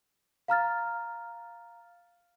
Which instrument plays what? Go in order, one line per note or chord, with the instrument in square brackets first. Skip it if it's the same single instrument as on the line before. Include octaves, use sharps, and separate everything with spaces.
[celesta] F5 A#5 F6 A6